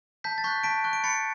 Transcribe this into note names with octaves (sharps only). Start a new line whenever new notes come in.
A5 G6 B6
A6
C#6 F#6 G6 B6
A5 B6 D7
C#6 F#6
D7
B5 A6 C#7